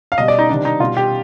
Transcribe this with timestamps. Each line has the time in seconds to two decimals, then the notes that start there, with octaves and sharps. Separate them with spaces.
0.12 F5
0.18 B2 G3 D#5
0.28 D5
0.39 D#4
0.49 C3 D#3 G3 D4
0.65 D#4
0.80 B2 G3 F4
0.97 G4